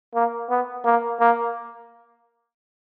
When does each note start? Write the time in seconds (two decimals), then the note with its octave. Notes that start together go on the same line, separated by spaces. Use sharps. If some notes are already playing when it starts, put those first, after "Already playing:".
0.15 A#3
0.50 B3
0.85 A#3
1.20 A#3